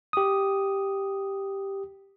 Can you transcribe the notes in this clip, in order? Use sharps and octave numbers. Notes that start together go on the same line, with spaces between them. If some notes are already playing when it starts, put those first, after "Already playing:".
G4 D#6